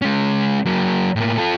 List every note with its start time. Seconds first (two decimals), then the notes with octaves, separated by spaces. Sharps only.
0.02 G#3 C#4
0.66 F#3 A#3
1.16 A2 A#3
1.38 F4 A4